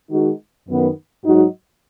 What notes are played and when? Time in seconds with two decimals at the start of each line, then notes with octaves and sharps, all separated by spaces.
0.10 D#3 G#3 D#4 F#4
0.68 F#2 D#3 B3
1.25 G#2 F#3 D#4 F#4